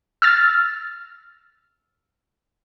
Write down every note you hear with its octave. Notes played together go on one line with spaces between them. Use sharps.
E6 F6 A6